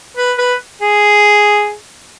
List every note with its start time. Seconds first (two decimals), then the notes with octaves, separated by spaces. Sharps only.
0.17 B4
0.38 B4
0.82 G#4